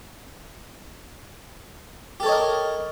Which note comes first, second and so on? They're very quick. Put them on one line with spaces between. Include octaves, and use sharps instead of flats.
G4 A4 C#5 D#5 A#4